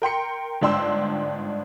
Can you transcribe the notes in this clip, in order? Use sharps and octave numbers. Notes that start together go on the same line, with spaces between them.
A#4 G5 C6 C#7
G1 G#2 D4 G5 C6 E6